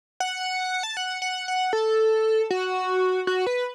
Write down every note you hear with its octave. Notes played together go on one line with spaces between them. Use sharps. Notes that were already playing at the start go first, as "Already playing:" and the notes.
F#5
A5
F#5
F#5
F#5
A4
F#4
F#4
B4